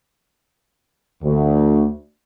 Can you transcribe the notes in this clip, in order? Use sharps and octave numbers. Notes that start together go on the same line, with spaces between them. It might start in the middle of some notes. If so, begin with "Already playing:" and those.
D2